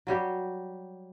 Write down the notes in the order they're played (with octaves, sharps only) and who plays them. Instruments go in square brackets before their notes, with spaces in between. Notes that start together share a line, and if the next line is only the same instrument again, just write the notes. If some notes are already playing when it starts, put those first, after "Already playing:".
[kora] F#3 G3 G4